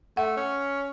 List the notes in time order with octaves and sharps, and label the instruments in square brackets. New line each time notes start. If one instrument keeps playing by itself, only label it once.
[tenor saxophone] A3 [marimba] F#5
[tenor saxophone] C#4